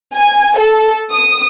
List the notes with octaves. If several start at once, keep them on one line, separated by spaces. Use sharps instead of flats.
G#5
A4
D#6